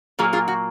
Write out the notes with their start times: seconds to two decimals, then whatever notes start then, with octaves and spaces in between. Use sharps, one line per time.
0.19 A#2 F#3 A#3 F4 G#4
0.33 F4 G#4
0.48 F#4